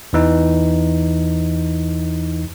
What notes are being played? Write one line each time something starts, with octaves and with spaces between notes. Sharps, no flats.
E2 E3 D#4